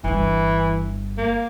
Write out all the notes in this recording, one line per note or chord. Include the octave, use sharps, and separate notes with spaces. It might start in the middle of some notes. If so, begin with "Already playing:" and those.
G1 G2 E3
A#3